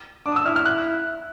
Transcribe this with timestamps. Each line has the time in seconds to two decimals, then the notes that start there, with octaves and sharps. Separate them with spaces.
0.26 D4 D6
0.32 D#6
0.36 E6
0.46 E4 F6
0.56 F6
0.65 F#6